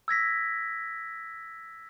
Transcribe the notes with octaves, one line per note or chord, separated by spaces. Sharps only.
E6 G#6 A#6 B6